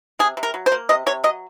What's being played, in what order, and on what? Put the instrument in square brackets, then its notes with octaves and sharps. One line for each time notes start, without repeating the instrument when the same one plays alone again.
[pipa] C3 G#4
C3
A#4
F#3
C5
A#3
C3 D#5
C3 C#5
F#3 D#5